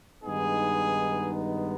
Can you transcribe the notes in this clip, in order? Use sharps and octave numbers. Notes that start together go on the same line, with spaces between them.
G2 D#3 G#3 B3 D#4 G#4